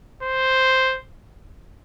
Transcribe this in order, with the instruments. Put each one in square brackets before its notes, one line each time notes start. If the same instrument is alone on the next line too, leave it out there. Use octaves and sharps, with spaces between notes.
[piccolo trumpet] C5